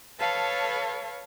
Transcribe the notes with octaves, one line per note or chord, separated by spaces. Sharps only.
A4 B4 C#5 F5 A5